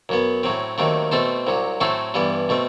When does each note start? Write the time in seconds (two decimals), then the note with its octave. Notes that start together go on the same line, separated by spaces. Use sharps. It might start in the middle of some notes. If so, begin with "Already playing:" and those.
0.09 F#2 F#3 B3
0.43 A2 F#3 C4
0.78 D#2 D#3 F#3 A3 C4
1.12 B2 A3 C4 A4 C5
1.47 C2 C3 F#3
1.81 A2 F#3 A3 C4 A4 C5
2.14 G2 E3 G3 B3
2.49 B2 A3 C4